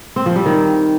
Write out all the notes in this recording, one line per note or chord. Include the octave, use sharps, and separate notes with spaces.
C4
F3
G3
D#3